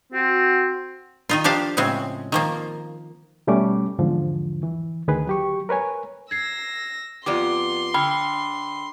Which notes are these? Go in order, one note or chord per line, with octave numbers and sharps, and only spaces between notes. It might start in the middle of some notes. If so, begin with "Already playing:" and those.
C4 F#4
D#3 D#4 F4
F3 D4 G4 F5 A5
A2 C#3 G#3 C4
D#3 F3 A#3
B2 G3 A3 C#4 D6
E2 G#2 D3 F3
E3
D2 D#3 G#4 B4
F#3 G4 C#6
A#4 B4 C#5 G#5
E6 G#6 A#6 C7
F2 B3 F4 G4 D5 C6 D6
D3 G5 B5